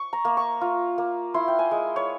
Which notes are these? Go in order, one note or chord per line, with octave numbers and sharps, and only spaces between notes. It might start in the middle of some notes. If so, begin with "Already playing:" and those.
Already playing: C#6
A#5
A#3
C#6
F4
A#3
E4 C6
G5
G#5
G#3
C#5